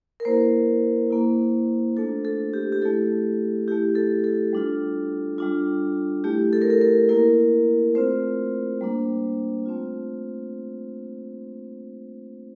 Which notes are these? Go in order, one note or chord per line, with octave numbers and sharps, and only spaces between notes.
A#4
A#3 E4 C5
A#3 E4
A3 D4 F4 A4
A4
G4
G4
A3 E4 A4
A3 E4 G4
A4
A4
G3 D4 F4
G3 D4 F4
A3 E4 G4
A4
A#4
A4
A#4
A#3 E4 A#4
A3 C4 F4 C5
G3 A#3 D4
A3 C4 F4